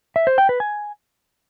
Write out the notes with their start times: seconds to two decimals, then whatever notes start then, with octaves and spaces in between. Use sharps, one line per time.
0.16 E5
0.27 C5
0.38 G5
0.49 B4
0.60 G#5